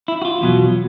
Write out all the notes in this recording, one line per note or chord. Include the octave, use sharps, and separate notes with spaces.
E4
F#4
F4
E2 B2 F#3